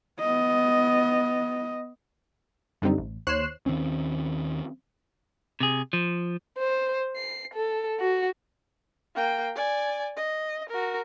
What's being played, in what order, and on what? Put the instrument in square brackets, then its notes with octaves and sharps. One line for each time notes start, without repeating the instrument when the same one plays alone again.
[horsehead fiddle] B3 D#5
[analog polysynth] F#2 D3 G3 C4 D#4
A1
D#2 C5 C#5 F#6 C7 E7
[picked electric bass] D#2 D#3 C4 C#4
[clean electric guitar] C3 G#4
F3
[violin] C5
C7
A4
F#4
[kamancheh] A#3 G5
D5 G#5
D#5
F#4 A#4